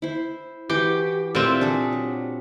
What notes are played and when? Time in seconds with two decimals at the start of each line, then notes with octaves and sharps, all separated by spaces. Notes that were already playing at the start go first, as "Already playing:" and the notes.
0.02 E4 C5
0.70 E3 F#4 G4
1.35 A#2 C4 E5
1.61 D4 G#4 A4
1.93 F#3